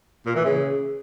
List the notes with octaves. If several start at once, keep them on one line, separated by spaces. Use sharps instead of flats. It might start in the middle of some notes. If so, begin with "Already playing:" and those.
A#2
E3
C#3